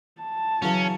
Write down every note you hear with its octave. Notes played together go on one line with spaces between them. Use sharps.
A5
C#3 E3 F#3 C#4